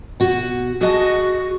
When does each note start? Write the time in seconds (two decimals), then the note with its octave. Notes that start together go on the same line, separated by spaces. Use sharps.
0.20 B2 F#4 F#5
0.81 F#4 G#4 D#5 A5